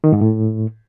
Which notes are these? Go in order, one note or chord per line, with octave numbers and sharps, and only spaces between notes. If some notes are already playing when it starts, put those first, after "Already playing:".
D#3
G#2
A2